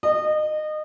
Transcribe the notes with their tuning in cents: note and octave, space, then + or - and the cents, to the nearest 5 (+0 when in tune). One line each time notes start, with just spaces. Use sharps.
D#5 -25